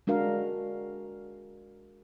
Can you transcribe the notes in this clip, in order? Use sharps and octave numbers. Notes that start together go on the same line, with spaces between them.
G#3 D4 F#4 A#4 F5